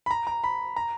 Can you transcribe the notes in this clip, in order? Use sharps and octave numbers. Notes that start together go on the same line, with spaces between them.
B5
A#5
A#5
B5
A#5